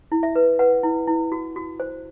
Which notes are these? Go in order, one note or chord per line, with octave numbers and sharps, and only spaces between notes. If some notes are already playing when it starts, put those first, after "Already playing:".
E4
E5
B4
B4 F#5
E4
E4
F#4
F#4
C5